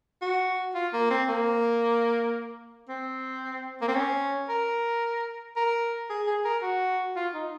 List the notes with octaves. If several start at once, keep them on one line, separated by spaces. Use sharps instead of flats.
F#4
F4
A#3
C4
A#3
C4
A#3
C4
C#4
A#4
A#4
G#4
G#4
A#4
F#4
F4
D#4